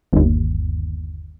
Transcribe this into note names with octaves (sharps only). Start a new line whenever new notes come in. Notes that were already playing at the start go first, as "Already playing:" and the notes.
G1 D#2